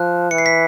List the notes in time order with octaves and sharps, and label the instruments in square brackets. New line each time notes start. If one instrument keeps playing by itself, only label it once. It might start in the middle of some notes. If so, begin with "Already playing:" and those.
Already playing: [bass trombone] F3 [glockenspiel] F#6
[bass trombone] E3 [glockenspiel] C#7
[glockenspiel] C7
B6